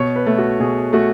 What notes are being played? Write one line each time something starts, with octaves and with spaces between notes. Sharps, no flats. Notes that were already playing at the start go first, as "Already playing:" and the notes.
Already playing: B2 C#5
B4
A3
F#4
B2 G#4
A3 F#4